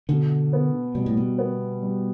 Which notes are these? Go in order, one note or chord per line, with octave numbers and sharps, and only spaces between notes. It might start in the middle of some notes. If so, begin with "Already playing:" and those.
B2 D3
B3
B2 G3
A2
B2
B3
G3